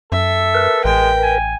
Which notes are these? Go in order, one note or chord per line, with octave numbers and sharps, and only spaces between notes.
F#2 A4 E5
A#4 B4
A1 G#3 G5
G#5